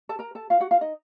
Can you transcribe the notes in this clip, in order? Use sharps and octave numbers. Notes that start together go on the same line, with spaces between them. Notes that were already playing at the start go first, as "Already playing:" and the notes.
A4 A5
A#4 A#5
A4 A5
F4 F5
F#4 F#5
F4 F5
D#4 D#5